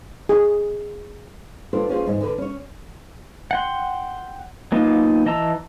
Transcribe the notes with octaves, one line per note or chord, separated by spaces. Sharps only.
G#4
D4 F4 G4 A4 B4 C5
C#4 F4 G#4 C5
E2 G#2 G#3
D3 B4
C#4 C#5
F#5 G5 C6
F#3 A#3 B3 D#4 F4
E3 D#5 A5 A#5 E6